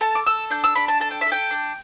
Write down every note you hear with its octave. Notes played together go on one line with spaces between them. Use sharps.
A4 A5
D6
A4 E6
D4 G6
E6
D4 B5
A5
A4 A5
G5
E5
A4
G5
D4